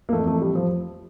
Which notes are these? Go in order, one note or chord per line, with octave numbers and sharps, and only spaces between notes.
A#3
F2 E3 A3
A3
G3
F3